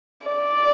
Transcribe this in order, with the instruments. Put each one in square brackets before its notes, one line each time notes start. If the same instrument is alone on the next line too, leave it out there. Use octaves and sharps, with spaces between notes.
[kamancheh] D5